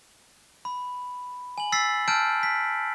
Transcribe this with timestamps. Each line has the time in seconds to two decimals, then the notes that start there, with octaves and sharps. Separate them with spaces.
0.65 B5
1.58 G#5 F#7
1.72 E6 A6 B6 C7
2.08 A5 E6 F6 G6 D7
2.43 B6